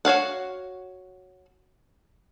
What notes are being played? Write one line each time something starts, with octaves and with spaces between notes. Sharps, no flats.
F#4 C#5 F5 F#5